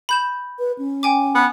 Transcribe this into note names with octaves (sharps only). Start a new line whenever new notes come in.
B5 G6 E7
B4
C#4
G5 G#5 D6
B3